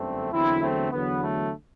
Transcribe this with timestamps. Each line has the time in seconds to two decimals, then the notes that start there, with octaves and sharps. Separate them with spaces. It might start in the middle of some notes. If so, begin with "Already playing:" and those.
Already playing: G1 F#2 D3 A3 C4
0.32 E2 D3 F#3 C4 E4
0.62 A3 C4
0.91 E2 D3 F#3 B3
1.21 A3